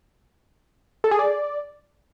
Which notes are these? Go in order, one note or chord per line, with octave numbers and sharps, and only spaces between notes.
A4
G#4
D5